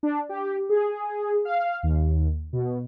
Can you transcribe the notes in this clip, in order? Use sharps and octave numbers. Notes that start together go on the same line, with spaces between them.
D4
G4
G#4
F5
D#2
B2